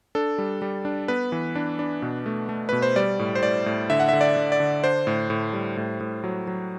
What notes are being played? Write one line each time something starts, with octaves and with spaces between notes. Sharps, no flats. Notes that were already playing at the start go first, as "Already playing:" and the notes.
D4 A4
G3
G3
D4
B3 B4
E3
D4
D4
B2
A3
A3
B2 B4
C5
G3 D5
A2
C5
A2 D5
A2
D3 E5
F#5
D3 E5
D5
D3
D5
D3
D4 C5
A2
A2
G3
A2
A2
F#3
F#3